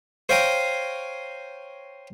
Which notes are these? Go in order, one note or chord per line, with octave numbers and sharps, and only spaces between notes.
C5 C#5 F5 G5 G#5 A#5